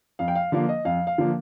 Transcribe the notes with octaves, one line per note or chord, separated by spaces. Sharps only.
F2 F5
G5
F5
D3 F3 A#3 F5
D#5
F2 F5
F5
D3 F3 A#3